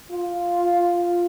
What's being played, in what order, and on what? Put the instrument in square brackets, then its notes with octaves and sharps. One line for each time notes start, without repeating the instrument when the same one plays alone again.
[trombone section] F4